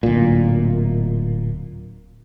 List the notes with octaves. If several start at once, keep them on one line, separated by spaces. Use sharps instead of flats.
D1 A#2